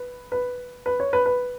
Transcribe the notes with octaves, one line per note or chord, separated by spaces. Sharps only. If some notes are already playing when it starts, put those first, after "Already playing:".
Already playing: B4
B4
B4
C#5
B4
B4